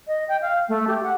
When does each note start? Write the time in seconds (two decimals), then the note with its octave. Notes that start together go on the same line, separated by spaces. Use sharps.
0.07 D#5
0.28 G5
0.41 F5
0.69 A3
0.87 G4
1.03 F#5